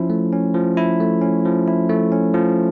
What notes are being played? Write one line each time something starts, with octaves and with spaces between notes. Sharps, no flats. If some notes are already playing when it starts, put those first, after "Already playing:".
Already playing: F3 C#4 E4
A3
C#4
F3
E4
A3
C#4
F3
E4
A3
C#4
F3